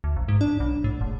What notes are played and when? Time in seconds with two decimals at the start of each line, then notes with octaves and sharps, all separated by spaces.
0.04 D2
0.16 A#1
0.28 G#2
0.41 D4
0.60 B1
0.84 A2
1.01 F#1